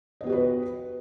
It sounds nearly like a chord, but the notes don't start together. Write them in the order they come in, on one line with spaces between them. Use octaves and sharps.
D#5 B3 G4 F#4 B4